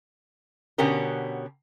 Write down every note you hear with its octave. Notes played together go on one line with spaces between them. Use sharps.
B2 D3 B3 C#4 G4 A#4